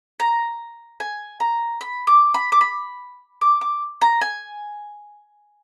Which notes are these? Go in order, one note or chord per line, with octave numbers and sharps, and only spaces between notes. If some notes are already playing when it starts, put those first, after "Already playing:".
A#5
G#5
A#5
B5
D6
B5
D6
B5
D6
D6
A#5
G#5